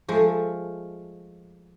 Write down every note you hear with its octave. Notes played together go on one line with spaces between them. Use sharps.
F3 G#3 A3